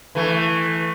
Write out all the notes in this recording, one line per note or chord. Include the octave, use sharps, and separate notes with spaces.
E3 A3